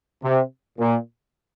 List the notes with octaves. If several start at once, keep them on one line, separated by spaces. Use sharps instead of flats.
C3
A#2